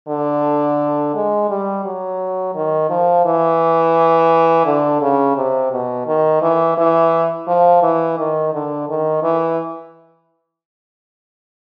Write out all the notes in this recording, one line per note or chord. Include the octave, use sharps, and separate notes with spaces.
D3
G#3
G3
F#3
D#3
F3
E3
D3
C#3
C3
B2
D#3
E3
E3
F3
E3
D#3
D3
D#3
E3